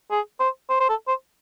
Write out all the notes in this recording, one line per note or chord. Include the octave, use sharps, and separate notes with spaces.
G#4
C5
C5
C5
A4
C5